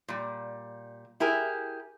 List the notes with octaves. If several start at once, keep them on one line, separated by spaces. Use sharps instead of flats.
A#2 G3
E4 G4 G#4 A#4